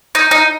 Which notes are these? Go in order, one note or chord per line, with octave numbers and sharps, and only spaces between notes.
D#4
D#4